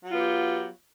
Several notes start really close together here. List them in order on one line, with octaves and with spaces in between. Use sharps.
F#3 F4 B3 G4